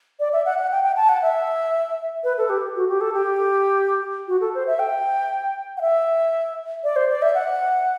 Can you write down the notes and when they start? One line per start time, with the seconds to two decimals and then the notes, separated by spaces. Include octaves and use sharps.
0.20 D5
0.33 E5
0.46 F#5
0.58 F#5
0.72 G5
0.83 G5
0.97 A5
1.09 F#5
1.22 E5
2.24 B4
2.38 A4
2.50 G4
2.76 F#4
2.89 G4
3.01 A4
3.14 G4
4.28 F#4
4.41 A4
4.55 C5
4.67 E5
4.79 G5
5.77 F#5
5.81 E5
6.84 D5
6.96 C5
7.10 D5
7.22 E5
7.35 F#5